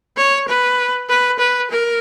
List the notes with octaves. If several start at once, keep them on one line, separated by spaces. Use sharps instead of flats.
C#5
B4
B4
B4
A#4